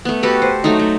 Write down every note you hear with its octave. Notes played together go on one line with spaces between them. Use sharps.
A3 B3
F#4 G4 A4 B4
C5
F#3 A3 D#4
A3